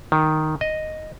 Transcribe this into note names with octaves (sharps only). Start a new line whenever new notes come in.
D#3
D#5